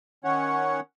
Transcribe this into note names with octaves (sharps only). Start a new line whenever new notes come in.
D#3 C#4 C#5 F#5